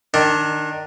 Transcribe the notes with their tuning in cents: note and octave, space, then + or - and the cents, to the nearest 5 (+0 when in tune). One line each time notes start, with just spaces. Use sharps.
D#3 -20 D4 +0